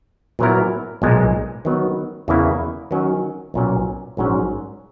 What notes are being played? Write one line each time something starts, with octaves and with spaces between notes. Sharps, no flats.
A#2 F#3 B3 E4 A#4
B1 A#2 G#3
D#3 F#3 B3
E2 C#3 E3 A#3 E4
D#3 F#3 C#4
B1 A#2 F#3 C#4
A#1 G#2 F#3 C#4